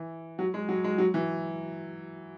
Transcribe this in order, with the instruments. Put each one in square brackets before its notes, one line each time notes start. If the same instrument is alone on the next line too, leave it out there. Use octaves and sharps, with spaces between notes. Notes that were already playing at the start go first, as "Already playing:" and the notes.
Already playing: [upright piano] E3
F#3
G#3
F#3
G#3
F#3
E3